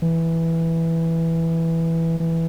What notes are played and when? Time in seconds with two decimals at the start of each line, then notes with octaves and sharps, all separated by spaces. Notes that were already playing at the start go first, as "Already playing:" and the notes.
0.02 E3
2.20 E3